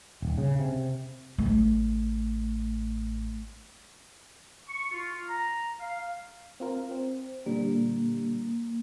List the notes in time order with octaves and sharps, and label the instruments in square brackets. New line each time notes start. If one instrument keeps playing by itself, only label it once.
[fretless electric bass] D#1
C#3
C3
[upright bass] A1 A3
[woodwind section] C#6
F4
A#5
F5
[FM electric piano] C4 F4 A#4
C4
[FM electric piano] A#2 D3 G3 [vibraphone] A#3